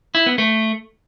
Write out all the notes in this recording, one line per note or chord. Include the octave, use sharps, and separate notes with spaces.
E4
B3
A3